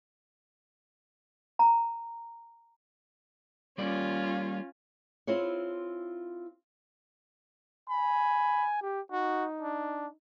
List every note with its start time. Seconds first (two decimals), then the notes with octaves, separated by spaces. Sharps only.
1.59 A#5
3.78 G3 A#3 C#4 F4 D5
5.27 C4 E4 F4 G#4 C#5
7.89 G#5 B5
8.82 G4
9.12 D#4 F#4
9.62 D4